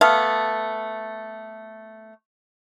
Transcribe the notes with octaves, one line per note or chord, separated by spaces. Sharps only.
A3 B3 F5